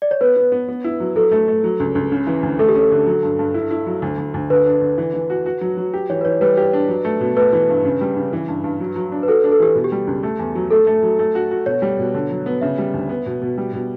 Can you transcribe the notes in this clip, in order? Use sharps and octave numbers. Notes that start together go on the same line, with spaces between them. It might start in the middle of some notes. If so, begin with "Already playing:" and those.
D5
C#5
B3 B4
B3
B3
B3
E4
F#3
F#3 A4
A3
A3
F#3
C#2
C#2
C#3
E3
D2
A3 A4
G4
C#4 A4
D3
F#3
G2
G2
E4
E4
F#3
D2
D2
D2
D3 B4
D4
D3
E3
E3
F#4
F#4
F#3
F#3
G4
E3 C#5
B4
E3 C#5
G3 B4
G4
D4
F#3
A3
B2
A3 B4
E3
G2
C#3
G3
C#3
E3
G2
G2
F#3
F#3
D4
B4
F#4 A4
D4
A4
E3 G4
B2
G4
G3
C#2
A3
E2
F#3
A3 A4
A3
F#3
A3
F#4
F#4
B2 C#5
G3
B2
D3
F#3
B3
C#3 E5
G3
D2
B3
B2
B2
G3
B2